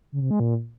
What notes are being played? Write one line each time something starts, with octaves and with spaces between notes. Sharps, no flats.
C#3
C3
G#3
A#2